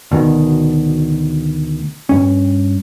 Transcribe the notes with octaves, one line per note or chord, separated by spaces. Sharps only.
D2 B2 D#3
G2 C#4